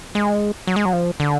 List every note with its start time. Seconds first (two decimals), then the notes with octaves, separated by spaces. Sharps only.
0.15 G#3
0.67 F#3
0.76 G#3
0.85 F#3
0.93 F3
1.20 D3